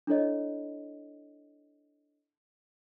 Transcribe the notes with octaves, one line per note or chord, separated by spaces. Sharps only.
D4 E4 A4 C#5 D#5